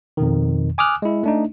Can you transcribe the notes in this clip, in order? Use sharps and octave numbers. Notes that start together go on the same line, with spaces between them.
F2 B2 D#3
G#5 D6 D#6 F6 F#6
G#3 E4
A3 D4 D#4